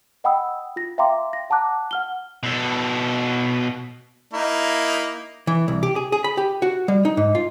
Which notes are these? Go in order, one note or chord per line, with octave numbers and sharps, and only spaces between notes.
D#5 F#5 G5 B5 D#6 E6
F4 A#6
E5 F5 G5 A#5 C6 D6
A#6
F#5 A5 A#5 D6 F#6
F#5 F6 G7
B2 A4
A#3 D#4 E4
E3
C2
G4
G#4
G#4
B5
G4
F#4
G3
D#4
G#2
F4